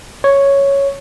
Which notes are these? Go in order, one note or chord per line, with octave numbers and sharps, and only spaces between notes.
C#5